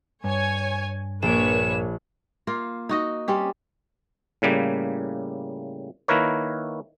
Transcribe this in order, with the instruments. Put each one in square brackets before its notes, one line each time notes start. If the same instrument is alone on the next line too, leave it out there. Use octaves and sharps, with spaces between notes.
[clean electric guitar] G2 [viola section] C#5 G#5
[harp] A#1 D7 [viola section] A#3 B4 C#5 [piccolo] E7
[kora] A#3 F4
D#4 F#4 D#5
G3 C4 C#4 G4
[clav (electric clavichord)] A2 C#3 G3 A#3
D#3 A#3 E4 A#4 B4 C#5